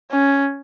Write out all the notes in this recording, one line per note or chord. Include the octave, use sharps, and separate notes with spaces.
C#4